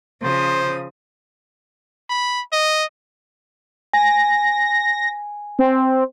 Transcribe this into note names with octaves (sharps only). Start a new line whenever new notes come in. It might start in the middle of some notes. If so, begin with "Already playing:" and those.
C#3 F3 C5 D#6
B5
D#5
G#5 A#6
C4